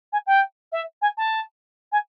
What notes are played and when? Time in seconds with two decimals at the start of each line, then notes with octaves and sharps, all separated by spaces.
0.12 G#5
0.26 G5
0.72 E5
1.01 G#5
1.17 A5
1.92 G#5